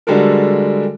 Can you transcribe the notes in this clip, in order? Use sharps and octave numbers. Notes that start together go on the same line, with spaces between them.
D3 G3 G#3 F#4 A4 A#4